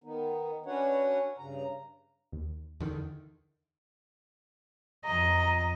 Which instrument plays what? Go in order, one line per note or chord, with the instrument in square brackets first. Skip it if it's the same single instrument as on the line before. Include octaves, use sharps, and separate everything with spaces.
[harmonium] D#3 B3 D#4
C#4 D4 F#4 B4 C#5 F#5
G2 C#3 A#5
[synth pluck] D#2
[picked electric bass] E2 D3 D#3
[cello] F2 D#5 [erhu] A#5